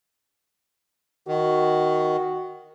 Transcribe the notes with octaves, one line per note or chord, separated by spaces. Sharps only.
D#3 F#4